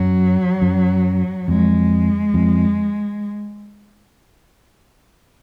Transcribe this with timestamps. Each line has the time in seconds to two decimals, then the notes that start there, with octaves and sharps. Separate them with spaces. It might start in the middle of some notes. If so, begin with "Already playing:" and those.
Already playing: F#2 F#3
0.62 F#2
1.48 F2 G#3
2.34 F2